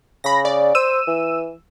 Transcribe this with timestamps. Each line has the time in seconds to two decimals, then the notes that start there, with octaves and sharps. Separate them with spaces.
0.24 C#3 B5 A#6
0.45 D5
0.75 C5 E6 D#7 E7
1.07 E3